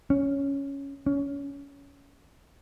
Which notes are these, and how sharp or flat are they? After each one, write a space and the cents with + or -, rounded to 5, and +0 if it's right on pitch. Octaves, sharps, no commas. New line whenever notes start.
C#4 +5
C#4 +20